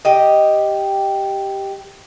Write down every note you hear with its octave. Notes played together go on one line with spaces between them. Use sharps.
G4 D#5